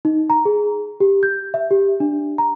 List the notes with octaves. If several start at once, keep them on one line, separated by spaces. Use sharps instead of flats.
D#4
A#5
G#4
G4
G6
E5
G4
D4
A#5